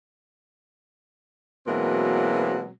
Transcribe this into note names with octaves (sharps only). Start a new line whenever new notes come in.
B2 E3 F#3 G#3 A#3 C4